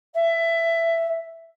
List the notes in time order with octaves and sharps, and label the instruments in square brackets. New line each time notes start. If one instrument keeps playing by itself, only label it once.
[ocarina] E5